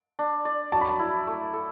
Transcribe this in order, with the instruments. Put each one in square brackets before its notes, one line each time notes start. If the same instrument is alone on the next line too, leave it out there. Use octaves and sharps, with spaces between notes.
[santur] D4
D5
[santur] F#3 [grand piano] A5
[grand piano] B5
A5
[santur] E4
A3
A4